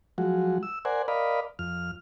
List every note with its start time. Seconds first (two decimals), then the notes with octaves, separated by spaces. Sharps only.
0.18 F3 F#3 G#3 F#4
0.63 E6
0.85 A#4 C5 D5 F#5 G#5
1.08 A#4 D5 D#5 F5 B5
1.59 F2 F6